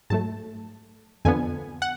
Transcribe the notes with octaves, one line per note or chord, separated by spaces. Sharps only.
G#2 F#3 A3 A5
F2 D3 F3 B3 G#5
F#5